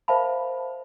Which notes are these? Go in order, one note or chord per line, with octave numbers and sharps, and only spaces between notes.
A#4 C5 E5 F5 A5 B5